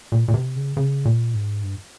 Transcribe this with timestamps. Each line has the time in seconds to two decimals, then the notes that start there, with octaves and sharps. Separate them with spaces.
0.12 A#2
0.28 A#2
0.34 C3
0.55 C#3
0.77 C#3
1.05 A#2
1.34 G#2
1.63 G2